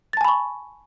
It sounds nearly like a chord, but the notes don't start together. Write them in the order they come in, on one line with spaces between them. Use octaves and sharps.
A6 A5 G#5 B5 C#6